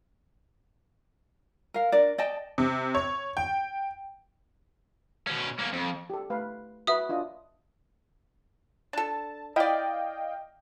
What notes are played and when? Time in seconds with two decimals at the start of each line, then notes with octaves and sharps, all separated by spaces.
1.74 A#4 F5
1.92 D4 A#4 D5
2.18 D5 D#5 G5 A5
2.58 C3
2.95 C#5
3.37 G5
5.27 B2 C#4
5.59 A#3 C#4
5.73 F2
6.10 G4 A4
6.30 A3 B4 F5
6.87 F#4 B4 E5 D#6
7.09 D4 F4 D#5
8.93 D4 A4 A5
9.56 E4 D5 D#5 F5 G5